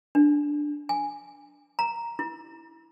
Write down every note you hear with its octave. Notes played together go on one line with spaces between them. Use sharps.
D4
G#5
A#5
E4